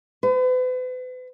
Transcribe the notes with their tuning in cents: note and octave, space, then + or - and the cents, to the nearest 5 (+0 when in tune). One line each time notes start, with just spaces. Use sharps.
B4 +40